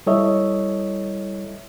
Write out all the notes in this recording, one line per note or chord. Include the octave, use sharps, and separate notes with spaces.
G3 E4 A4 C#5 D#5 E5